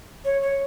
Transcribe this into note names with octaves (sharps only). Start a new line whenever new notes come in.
C#5
C#5